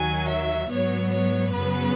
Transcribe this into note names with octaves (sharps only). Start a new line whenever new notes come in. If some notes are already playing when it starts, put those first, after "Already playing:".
Already playing: D#2 D#3 F#3 G#5
E5
G#2 F#3 B3 C#5
C#5
F#2 C#3 F#3 B3 B4